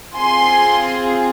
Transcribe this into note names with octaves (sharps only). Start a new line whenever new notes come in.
C4 F4 G#4 G#5 C6